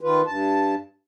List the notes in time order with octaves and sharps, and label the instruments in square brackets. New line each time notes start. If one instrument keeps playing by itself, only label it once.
[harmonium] D#3 F4 B4
G2 A5